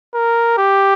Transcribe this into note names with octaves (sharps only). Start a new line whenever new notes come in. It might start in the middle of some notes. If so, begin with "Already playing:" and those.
A#4
G4